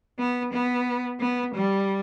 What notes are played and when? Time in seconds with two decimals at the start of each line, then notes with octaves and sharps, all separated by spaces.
0.19 B3
0.53 B3
1.20 B3
1.55 G3